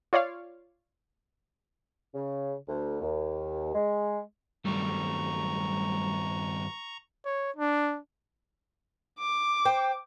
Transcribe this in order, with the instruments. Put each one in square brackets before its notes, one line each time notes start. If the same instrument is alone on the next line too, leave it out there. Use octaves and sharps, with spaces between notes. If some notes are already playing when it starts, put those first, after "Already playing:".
[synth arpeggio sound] F4 C#5 D5 F5
[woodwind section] C#3
D2
D#2
G#3
[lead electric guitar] G2 D#3 [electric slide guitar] F#3 G3 A3 [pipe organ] A#5 C#6
[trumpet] C#5
D4
[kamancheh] D6
[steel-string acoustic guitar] C5 G5